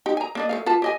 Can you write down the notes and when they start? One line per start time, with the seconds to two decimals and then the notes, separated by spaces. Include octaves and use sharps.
0.06 D#4 G4
0.17 G#5 A#5
0.35 A#3 D4 D#5
0.49 A3 D#4 F5
0.66 F4 B4 A5
0.82 G4 D#5 G#5